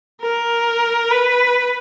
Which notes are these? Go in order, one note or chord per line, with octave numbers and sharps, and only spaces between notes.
A#4
B4